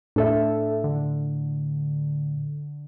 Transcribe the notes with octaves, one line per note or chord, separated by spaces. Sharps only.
A2 D4 A4 E5
D3